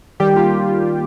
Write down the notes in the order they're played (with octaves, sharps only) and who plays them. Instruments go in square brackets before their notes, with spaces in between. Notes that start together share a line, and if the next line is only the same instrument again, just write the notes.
[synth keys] D#3 G3 G4
A#3 F4